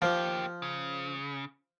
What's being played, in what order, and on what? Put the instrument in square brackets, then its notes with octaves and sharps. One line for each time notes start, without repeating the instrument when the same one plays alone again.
[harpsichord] F3 [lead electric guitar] A#3 G4
[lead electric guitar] C#3